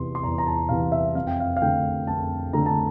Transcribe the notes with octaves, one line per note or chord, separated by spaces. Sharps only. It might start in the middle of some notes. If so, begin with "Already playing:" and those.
Already playing: E2 C3 E3 C6
C6
E2 A#5
A#5
A5
C3 E3 F5
E5
F2 F5
G5
F5
F5
D3 A3 G5
F2 A5
D3 A3 A#5
A5